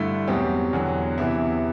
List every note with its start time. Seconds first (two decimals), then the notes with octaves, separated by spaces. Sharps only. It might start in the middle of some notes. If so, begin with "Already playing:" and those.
Already playing: G2 D3 A3 E4
0.28 E2 B2 F#3 C4 G4
0.73 E2 D3 F#3
1.18 E2 C3 E3 B3 E4